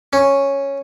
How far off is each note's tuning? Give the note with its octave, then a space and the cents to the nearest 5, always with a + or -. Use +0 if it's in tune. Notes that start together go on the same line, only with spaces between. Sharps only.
C#4 -5